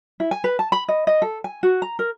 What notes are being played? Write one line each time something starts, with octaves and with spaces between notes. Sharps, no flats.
E4
G#5
B4
A5
B5
D#5
D#5
A4
G#5
F#4
A#5
A#4